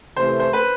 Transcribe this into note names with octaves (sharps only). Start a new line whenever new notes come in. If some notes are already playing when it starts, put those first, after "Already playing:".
C3 E3 A3 C5
C5
B4